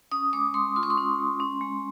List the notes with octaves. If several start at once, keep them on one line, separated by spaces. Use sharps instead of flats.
C#4 D#6
G#3 D6
G#3 C6
F4 C6
C#6
C6
C#4
G#3
C#4
G#3